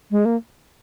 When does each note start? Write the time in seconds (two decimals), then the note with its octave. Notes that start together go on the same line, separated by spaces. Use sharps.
0.11 G#3
0.25 A#3